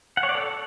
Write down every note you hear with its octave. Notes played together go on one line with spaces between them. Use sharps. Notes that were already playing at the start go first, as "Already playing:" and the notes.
F#5
C#5
D5
A4